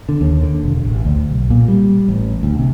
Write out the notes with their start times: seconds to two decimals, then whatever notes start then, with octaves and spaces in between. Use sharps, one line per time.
0.09 D3
0.21 D#2
0.43 D3
0.63 E1
0.85 A1
1.05 D2
1.31 B1
1.50 A#2
1.68 G3
2.09 A1
2.43 D2
2.59 C3